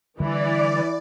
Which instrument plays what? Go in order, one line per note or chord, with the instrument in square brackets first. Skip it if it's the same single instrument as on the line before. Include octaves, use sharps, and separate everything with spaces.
[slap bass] D3 G3 [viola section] E3 [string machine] D5